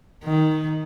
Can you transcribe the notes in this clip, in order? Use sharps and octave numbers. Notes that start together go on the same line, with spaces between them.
D#3